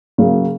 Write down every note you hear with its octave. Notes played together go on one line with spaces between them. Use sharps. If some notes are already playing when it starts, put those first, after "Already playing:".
C#3 F#3 A#3